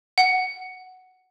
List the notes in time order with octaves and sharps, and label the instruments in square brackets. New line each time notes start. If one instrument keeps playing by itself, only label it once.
[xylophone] F#5